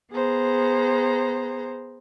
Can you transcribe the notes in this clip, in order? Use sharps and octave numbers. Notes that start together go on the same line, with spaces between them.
B3 G#4 C5 A#5